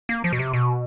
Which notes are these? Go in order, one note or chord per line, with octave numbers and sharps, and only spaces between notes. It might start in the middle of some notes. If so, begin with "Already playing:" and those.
A#3
F3
B2
C3
B2